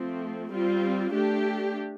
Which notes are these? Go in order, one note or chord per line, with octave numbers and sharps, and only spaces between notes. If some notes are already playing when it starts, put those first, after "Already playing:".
Already playing: F3 A3 C4
G3 C4 F4
A3 D4 G4